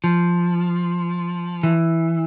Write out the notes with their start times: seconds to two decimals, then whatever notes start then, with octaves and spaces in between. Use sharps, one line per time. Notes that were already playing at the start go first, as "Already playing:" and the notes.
0.04 F3
1.63 E3